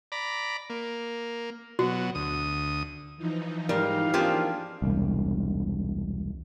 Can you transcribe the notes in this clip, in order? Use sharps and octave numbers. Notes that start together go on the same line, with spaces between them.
D5 A#5 B5
A#3
B2 F#3 F#4
D2 D#6
E3 F3 D#4
G#2 G3 A#4 F5
A#3 C4 D4 F4 G4 G#4
E1 C2